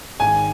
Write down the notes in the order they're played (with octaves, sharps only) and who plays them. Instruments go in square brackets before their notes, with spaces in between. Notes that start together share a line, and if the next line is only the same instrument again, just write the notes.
[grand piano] G#1 G#2 D#3 [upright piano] G#5